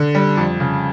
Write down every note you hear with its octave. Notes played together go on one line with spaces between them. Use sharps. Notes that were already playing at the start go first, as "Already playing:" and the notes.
Already playing: D3
G3
F2
C#3